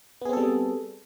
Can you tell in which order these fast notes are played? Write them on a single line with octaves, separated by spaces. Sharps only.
B3 G#4 C4 A4 G3